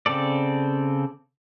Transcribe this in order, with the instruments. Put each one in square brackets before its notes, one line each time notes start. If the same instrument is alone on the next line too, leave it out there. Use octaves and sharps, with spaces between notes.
[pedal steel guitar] C#3 C4 A4 D5